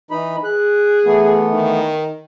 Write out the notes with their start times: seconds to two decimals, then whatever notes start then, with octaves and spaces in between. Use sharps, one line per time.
0.11 E3 D#4 B5
0.44 G#4 F#6
1.05 E3 A3 B3
1.53 D#3